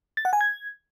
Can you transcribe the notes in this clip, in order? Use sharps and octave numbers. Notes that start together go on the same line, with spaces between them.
A6
F#5
G#5
G#6